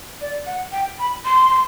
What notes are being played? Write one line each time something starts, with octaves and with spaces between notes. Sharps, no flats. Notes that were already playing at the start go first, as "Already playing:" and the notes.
D5
F#5
G5
B5
C6